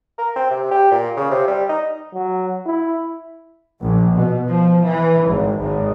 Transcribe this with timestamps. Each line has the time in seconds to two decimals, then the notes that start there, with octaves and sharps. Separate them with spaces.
0.18 A#4
0.36 C4
0.51 C3
0.71 G4
0.91 A#2
1.17 C#3
1.31 C3
1.48 G3
1.69 D#4
2.14 F#3
2.66 E4
3.81 A#1
4.15 B2
4.48 F3
4.83 E3
5.29 G#1
5.59 G#1